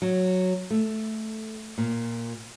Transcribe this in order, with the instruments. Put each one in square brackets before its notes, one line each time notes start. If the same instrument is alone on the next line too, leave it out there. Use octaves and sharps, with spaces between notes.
[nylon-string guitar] F#3
A3
A#2